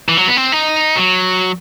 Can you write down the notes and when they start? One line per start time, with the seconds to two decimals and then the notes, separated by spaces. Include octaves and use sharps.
0.09 E3
0.17 F#3
0.27 B3
0.37 C4
0.52 D#4
0.96 F#3